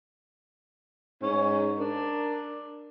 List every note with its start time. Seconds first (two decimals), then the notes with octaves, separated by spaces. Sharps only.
1.22 G#2 C#4
1.79 D4 A#4